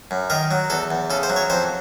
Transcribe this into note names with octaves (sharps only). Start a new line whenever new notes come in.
F#2
D#3 A#4
F#3
E2 A4
E2
C#3 A4
C5
F#3
C#5
F2 C5